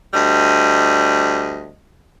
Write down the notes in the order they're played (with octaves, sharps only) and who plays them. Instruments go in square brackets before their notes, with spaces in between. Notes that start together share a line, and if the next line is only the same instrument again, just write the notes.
[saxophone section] D2 G3 D#5